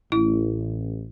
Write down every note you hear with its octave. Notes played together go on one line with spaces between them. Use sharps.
A1 E4